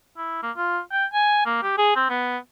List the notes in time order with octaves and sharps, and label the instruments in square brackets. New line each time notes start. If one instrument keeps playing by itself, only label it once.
[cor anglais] E4
A#3
F4
G5
G#5
A#3
G4
G#4
C4
B3